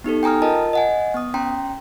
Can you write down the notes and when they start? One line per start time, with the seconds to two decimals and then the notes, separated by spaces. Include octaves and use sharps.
0.04 B3 D#4 G4 A4
0.23 G5 G#5 A#5 D#6 F6
0.42 F4 A#4 D#5 A5
0.73 D#5 F#5 G#5
1.14 B3 D#6
1.34 C#4 G5 A#5 C6